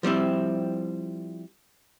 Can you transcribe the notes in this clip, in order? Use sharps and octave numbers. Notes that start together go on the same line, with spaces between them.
F3 G3 C4 E4